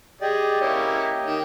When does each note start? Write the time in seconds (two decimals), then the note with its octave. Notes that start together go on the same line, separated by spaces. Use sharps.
0.21 G4 G#4 D5 D#5
0.61 A#3 C#4 E4
1.27 D#3